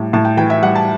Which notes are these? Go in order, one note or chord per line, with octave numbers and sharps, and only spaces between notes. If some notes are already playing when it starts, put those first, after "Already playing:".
Already playing: A2 G3
A2 A5
G5
E3 G5
E5
G3 F#5
A5